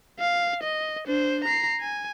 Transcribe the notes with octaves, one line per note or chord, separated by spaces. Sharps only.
F5
D#5
D4 C5
A#5 C7
G#5